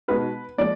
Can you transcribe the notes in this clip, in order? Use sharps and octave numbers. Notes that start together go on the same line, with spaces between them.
B2 G#3 D#4 F#4 B4
A#2 F3 G#3 D5